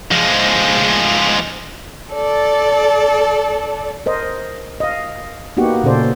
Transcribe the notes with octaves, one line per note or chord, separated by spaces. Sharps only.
F3 G#3
A4 D5
A#4 C5 D#5
D#5 F5
A#3 B3 D#4 F#4 G4 F#5
A#2 C#3 C#4 A4 C5 D5